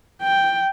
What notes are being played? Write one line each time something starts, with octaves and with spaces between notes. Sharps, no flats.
G5